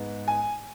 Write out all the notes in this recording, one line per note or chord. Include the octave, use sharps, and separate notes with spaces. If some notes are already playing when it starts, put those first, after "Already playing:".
Already playing: G#2 G#3 B3
G#5